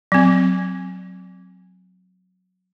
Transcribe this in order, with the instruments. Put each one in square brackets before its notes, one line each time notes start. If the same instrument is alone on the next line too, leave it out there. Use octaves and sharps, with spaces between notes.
[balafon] F#3 C4